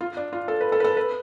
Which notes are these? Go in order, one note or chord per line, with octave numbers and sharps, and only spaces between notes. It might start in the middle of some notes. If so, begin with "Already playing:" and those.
F4
D4
F4
A4
B4
A4
B4
A4
B4